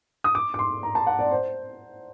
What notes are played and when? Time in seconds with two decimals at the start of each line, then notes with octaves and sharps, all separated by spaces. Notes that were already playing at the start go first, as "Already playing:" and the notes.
0.24 D#6
0.35 D6
0.54 D6
0.59 C6
0.83 A#5
0.95 A5
1.07 F#5
1.19 D5
1.31 C5